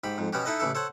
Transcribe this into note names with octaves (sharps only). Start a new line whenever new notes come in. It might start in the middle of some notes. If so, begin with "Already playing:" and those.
G#2 G4 B5
F2 G#2
B2 B3 C#4 F#4 G4
D#4 E4 A4 B4 D#5
A1 C#3 E3 E4 A4
A4 C5 C#5 F#5